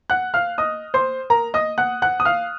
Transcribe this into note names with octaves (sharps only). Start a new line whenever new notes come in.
F#5 F#6
F5 F6
D#5 D#6
C5 C6
A#4 A#5
D#5 D#6
F#5 F#6
F#5 F#6
D#6
F5 F6